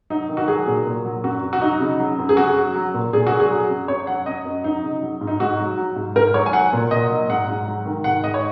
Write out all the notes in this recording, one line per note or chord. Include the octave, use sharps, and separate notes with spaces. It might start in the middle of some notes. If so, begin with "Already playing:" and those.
F#3 D#4
D#3
F#4
F#3 G#4
A#2
A#2
F#3
F#2 F#4
F#2
F#4
F#3 D#4
C#3
F#3
F#2
G#4
F#2 F#4
F#3
F#3
A#2
A#2 G#4
F#4
F#3
G#4
F#3
F#2
F#2 C#5
F#3 F#5
F#2 D#5
F#2
F#3 D#4
C#3
F#3
G#2
D#4
G#2 F#4
F#3
F#3
G#2
G#2 A#4
F#3 C#5
G#5
F#3 F#5
A#2
A#2 D#5
F#3
G#2 F#5
G#2
F#3
D#3
G#2 F#5
G#2 D#5
C#5